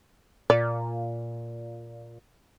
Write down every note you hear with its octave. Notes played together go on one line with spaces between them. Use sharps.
A#2 D5